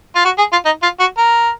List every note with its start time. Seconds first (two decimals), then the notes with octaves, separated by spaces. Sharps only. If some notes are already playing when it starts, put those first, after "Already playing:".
0.15 F4
0.25 F#4
0.38 G#4
0.52 F4
0.65 D#4
0.83 F4
1.00 F#4
1.18 A#4